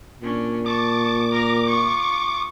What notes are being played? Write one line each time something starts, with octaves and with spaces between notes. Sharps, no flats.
A#2 C#4 D4
A5 C#6 D6
A#4 A#6
F4 C#6